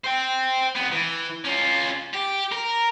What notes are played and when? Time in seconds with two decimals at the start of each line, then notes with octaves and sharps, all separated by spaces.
0.04 C5 G5
0.75 C2 B3
0.92 E3
1.45 C#4 F4
2.14 G4
2.52 A#4